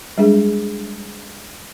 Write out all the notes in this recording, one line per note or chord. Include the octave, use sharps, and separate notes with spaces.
G3 G#3 D4 G#4